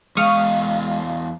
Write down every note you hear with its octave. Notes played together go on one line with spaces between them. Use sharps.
E2 G#3 F5 C#6 D#6 F6